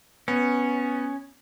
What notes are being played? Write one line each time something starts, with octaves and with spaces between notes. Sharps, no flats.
B3 C#4